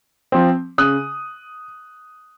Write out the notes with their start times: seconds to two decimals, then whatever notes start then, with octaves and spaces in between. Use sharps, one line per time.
0.32 F3 C4
0.78 C#3 D#6 F#6